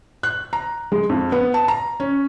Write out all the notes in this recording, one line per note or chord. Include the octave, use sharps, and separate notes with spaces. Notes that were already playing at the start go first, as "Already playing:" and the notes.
F#6
A#5
G#3
F2
B3
A5
A#5
C#4